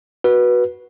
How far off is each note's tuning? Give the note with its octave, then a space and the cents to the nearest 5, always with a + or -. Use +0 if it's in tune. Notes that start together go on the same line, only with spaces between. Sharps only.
F#4 +0 B4 -15